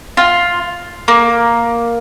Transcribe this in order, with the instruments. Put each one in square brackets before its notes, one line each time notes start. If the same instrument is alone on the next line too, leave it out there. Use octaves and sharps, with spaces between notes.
[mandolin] F4
A#3